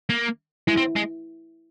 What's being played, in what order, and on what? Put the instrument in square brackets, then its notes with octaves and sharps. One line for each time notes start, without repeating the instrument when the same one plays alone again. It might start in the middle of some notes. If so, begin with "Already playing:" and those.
[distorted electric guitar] A#3
[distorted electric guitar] G#3 [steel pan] E4
[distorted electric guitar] C4
G#3